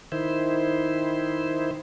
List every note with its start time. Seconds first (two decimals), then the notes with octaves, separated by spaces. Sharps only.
0.12 D#3 E4 C5